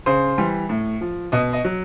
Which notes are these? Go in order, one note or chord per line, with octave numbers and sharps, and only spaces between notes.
C#3 C5
E3 G3
A2
F3
B2 D#5
D#5
F#3